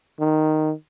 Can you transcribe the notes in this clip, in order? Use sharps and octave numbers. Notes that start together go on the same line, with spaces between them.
D#3